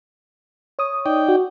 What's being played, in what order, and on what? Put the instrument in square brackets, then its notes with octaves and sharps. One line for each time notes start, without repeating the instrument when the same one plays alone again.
[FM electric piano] C#5 D#6
[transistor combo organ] D#4 D5 G5
[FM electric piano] F#4